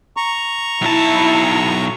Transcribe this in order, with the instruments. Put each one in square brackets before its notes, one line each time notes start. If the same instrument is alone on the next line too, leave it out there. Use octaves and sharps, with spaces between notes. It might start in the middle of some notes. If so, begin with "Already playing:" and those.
[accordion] A#5 C#6
[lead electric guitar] B1 A5 [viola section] E4